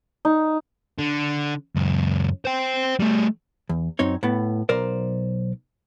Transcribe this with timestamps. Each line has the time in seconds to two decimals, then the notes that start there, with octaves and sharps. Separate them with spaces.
0.25 D#4
0.98 D3
1.76 C#2 F#2
2.45 C5 G5
3.00 G3 A3
3.69 E2
3.99 F#2 C4 D#4 C#5
4.23 A2 B3
4.69 B1 A#4 C5 D5